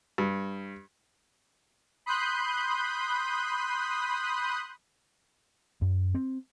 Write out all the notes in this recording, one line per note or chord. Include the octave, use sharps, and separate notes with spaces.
G2
B5 C6 D#6 F#6 G6
F#2
C4